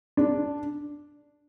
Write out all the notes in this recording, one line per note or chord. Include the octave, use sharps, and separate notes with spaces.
D4